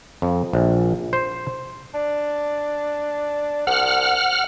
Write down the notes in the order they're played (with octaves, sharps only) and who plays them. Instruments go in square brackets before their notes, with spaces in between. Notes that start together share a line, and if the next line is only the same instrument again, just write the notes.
[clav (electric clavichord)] F2
A#1
C5
[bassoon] D4
[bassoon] C2 [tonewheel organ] F#5 F6